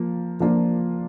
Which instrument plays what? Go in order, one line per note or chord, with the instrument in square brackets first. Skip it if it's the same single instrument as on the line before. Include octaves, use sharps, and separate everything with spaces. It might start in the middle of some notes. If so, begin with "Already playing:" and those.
Already playing: [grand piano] F3 A#3
F3 A#3 D4 F4